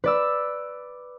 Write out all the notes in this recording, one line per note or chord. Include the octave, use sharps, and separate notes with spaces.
B4 D5 E6